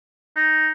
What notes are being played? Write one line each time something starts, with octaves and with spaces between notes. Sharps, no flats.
D#4